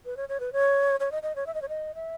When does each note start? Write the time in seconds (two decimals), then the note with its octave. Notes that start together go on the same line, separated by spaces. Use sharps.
0.05 B4
0.17 C#5
0.29 C#5
0.40 B4
0.53 C#5
1.00 C#5
1.12 D#5
1.23 D#5
1.36 C#5
1.47 E5
1.54 D#5
1.62 C#5
1.69 D#5
1.95 E5